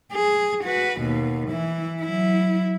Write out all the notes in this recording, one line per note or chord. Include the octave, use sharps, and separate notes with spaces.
G#4
F#4 B4
D#2 B2
E3 E4
F#3 E4